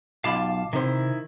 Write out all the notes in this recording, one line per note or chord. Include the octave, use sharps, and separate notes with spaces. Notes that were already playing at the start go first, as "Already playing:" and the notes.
B1 F4 F5 A5 B5 D6
C3 D#3 E4 C5